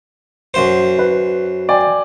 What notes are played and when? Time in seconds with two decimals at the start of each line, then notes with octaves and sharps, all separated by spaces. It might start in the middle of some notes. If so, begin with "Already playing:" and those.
0.54 F#2 C5
0.99 B4
1.69 D5 G5 G#5